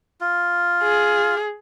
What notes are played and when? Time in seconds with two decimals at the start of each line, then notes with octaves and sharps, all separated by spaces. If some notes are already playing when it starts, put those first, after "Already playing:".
0.21 F4
0.83 G#4